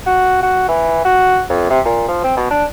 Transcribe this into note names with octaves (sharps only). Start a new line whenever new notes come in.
F#4
F#4
E3
F#4
F2
C3
A#2
F3
C4
B2
D4